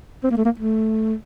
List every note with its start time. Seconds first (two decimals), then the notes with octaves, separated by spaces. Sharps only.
0.24 C4
0.30 A#3
0.37 A3
0.45 A#3
0.59 A3